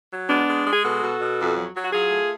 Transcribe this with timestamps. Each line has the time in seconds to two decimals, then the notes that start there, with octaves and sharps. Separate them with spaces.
0.11 F#3
0.29 G#3 B3 D4
0.48 G#3
0.65 G#3
0.73 G#4
0.84 B2 F#4 A4
1.02 B2
1.21 B2
1.39 F2
1.57 F#3
1.75 F#3
1.84 F#4
1.93 F#3 F4 G#4
2.11 A3